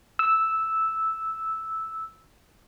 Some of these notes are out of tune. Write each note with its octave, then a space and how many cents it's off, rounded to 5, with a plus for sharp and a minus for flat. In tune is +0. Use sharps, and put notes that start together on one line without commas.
E6 -5